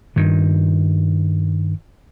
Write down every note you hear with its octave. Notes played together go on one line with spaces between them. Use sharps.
G2 D#3